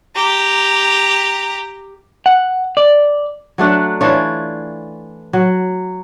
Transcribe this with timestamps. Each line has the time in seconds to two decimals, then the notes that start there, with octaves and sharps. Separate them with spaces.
0.16 G4 A#5
2.26 F#5
2.77 D5
3.58 F#3 A3 D4 F#5
4.01 E3 D4 F4 C#5
5.33 F#3